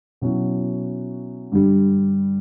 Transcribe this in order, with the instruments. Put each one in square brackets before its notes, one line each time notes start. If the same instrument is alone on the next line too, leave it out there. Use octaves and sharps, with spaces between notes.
[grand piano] B2 F#3 C#4 E4
G2 D3 G3